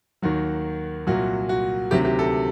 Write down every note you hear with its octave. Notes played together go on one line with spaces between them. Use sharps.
D#2 D#3 F#3 F#4
C2 A#2 F#3 F#4
F#4
D2 C3 D#3 F#3 G4
G4
A4